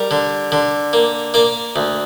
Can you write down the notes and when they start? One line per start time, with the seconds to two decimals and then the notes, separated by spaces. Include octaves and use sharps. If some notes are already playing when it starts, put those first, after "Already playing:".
Already playing: G3 A#4
0.11 D3
0.52 D3
0.93 A#3
1.34 A#3 D5
1.76 D2